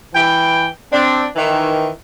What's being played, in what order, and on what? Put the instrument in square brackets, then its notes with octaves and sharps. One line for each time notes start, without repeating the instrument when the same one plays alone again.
[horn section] E3 G5
C4 D4
D#3 E3